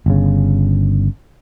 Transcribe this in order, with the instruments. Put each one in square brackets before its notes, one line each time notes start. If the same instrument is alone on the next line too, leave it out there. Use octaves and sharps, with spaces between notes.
[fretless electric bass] G1 C#3